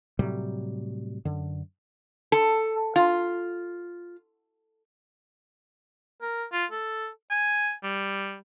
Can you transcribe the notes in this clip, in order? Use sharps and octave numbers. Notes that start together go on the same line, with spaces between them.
A2 C3 F#3 G3
F#2 D3
A4
F4
A#4
F4
A4
G#5
G3